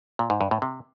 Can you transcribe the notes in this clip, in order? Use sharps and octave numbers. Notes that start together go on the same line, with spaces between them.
A#2
G#2
G2
A2
C3